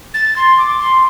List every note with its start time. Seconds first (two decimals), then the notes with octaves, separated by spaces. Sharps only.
0.14 A6
0.36 C6
0.58 D6
0.80 C6